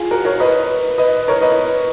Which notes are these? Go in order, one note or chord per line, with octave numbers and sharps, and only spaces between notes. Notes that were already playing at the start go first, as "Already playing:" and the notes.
Already playing: F4 G#4
F#4 A#4
A#4 C#5
B4 D#5
B4 D#5
A#4 C#5
B4 D#5